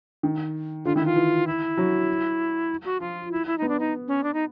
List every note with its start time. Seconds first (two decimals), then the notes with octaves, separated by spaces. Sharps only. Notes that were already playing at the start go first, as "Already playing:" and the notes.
0.23 D#3
0.85 D3 F4
0.96 D#3 E4
1.05 E3 F4
1.16 E3
1.47 E4
1.77 F#3
2.85 F#4
3.00 F3 F4
3.32 E4
3.47 E4
3.58 B3 D#4
3.69 D4
3.79 D#4
4.08 C#4
4.24 D4
4.34 D#4